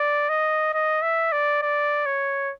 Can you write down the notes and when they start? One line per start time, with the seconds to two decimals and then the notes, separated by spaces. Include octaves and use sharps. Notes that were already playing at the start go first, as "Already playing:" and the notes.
Already playing: D5
0.29 D#5
0.74 D#5
1.02 E5
1.33 D5
1.63 D5
2.06 C#5